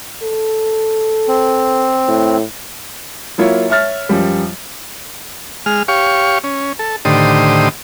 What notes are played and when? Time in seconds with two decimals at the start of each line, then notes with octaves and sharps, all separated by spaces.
0.23 A4
1.28 C4
2.08 A2
3.38 F#3 A#3 E4 F4 C#5
3.70 C#5 E5 F6 A6
4.09 F#2 F3 G3
5.66 G#3 F6
5.88 G4 C#5 F5 C#6
6.44 C#4
6.79 A4
7.05 A2 D3 D#3 G4 C5 D#6